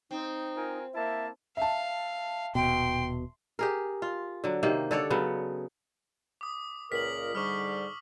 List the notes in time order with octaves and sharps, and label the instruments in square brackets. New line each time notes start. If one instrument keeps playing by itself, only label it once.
[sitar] C4 [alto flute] D#4
[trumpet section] F4 A#4 G#5
[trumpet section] A#3 E4 A5 [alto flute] E5
[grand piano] E5 A5 [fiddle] F5
[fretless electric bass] D#1 B2 [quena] G5 [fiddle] C6
[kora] G4 G#4 A#4
F4
D3 F#3
C3 D#3 A#3
D3 A4 C#5 D5
C#3 F#3 B3
[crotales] D6 D#6
[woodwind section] C#2 A#2 A#4 [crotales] B6 F#7
[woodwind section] G#2 D3 G3 [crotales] C#6 D6 F6